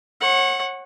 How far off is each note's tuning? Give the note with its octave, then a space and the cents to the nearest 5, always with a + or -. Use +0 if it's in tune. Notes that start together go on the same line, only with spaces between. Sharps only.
C#5 -35 F#5 +0